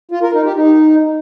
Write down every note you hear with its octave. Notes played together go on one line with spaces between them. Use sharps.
F4
A#4
D#4
G4
D#4